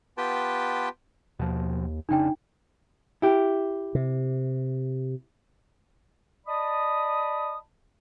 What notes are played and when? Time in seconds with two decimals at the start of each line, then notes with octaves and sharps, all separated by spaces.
0.17 B3 F4 G4 B4 G5 A5
1.39 D#2 B2 F3
2.09 F1 C#3 D4 D#4 G5
3.22 E4 G4
3.95 C3
6.46 D5 D#5 A5 B5 D#6